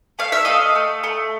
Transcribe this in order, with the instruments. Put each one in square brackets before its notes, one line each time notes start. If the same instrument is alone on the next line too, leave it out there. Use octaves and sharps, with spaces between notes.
[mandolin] A3 F5
E5
A3 D#5 F5
A3
A3